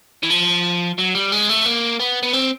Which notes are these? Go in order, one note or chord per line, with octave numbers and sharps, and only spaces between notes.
E3
F3
F#3
G3
G#3
A3
A#3
B3
B3
C4